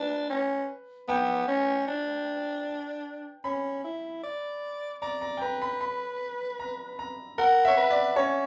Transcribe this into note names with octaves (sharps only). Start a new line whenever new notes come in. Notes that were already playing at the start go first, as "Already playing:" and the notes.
Already playing: D4 B4
C#4
B3 G5
C#4
D4
C#4 B5
E4
D5
D5 A#5
A#5
G5
B4 A#5
B5
B5
A#5
A#5
A#4 F#5
C#5 E5
B4
D5
C#4 C#5